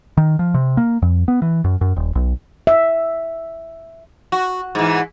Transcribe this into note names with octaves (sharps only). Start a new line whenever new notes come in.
D#3
F3
C3
A#3
F2
B3
E3
F#2
F#2
D#1
B1
E5
F#4
G#2 E3